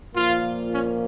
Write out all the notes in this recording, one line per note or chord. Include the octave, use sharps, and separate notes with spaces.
A#2 F3 A#3 F4
C#4